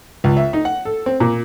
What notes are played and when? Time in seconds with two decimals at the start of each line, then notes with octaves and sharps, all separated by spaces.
0.24 C#2
0.37 E5
0.53 D#4
0.65 F#5
0.85 A4
1.06 C4
1.20 A#2